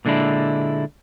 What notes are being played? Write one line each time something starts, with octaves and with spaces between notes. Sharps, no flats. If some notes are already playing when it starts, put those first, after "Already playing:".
A#2 D3 G#3 D4 E4